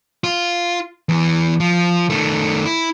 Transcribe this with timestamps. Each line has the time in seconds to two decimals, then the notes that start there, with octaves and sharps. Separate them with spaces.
0.24 F4
1.09 E2 E3
1.60 F3
2.10 D#3 A3
2.65 E4